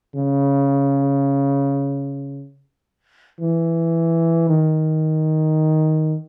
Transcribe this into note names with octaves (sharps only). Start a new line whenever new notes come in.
C#3
E3
D#3